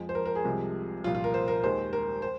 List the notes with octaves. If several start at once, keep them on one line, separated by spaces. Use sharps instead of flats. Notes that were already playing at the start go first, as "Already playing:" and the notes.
Already playing: F2 F3 G#3
C5
A#4
A#4
G#4
C2 C3 F3 G#3
C2 A#2 F3 F4
F4
A#4
C5
A#4
D#2 D#3 G#3 C5
A#4
C5